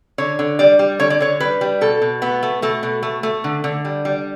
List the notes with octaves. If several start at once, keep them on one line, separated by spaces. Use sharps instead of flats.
D3 C#5
D3
G3 D5
G3
D3 C#5
D5
D3 C#5
G3 B4
G3
B2 A4
B2
A3 B3
A3
B2 A3
B2
A3
A3
D3
D3
G3
G3